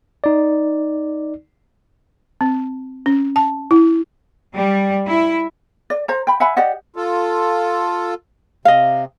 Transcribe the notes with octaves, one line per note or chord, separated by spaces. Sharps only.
D#4 D5
C4
C#4
A5
E4
G3
E4
D5
C5 A#5
G5 B5
E5 F#5 G#5 B5
G4 D5 D#5 F#5
F4 A4
C3 D#5 F5